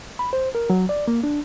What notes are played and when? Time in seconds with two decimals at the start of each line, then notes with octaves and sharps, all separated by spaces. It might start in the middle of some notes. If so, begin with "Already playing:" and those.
0.19 B5
0.33 C5
0.55 A#4
0.70 F#3
0.89 D5
1.08 A#3
1.24 D4